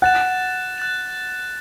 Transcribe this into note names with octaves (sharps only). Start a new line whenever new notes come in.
F#5 F#6 A6 E7
F#6 A6 E7